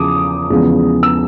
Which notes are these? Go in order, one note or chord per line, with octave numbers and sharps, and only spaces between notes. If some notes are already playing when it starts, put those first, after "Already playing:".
Already playing: E2 C#3 F3 D6 D#6
E2 C#3 F3 G#3 B3
E6